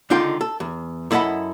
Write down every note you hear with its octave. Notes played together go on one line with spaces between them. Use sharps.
C#2 D3 D#4 F4 G5
A4
E2
F#2 E4 A4 D#5 F#5 B5